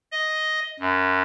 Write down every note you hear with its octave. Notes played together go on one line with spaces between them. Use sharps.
D#5
F#2